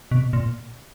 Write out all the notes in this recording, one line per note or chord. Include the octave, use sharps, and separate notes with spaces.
B2
A#2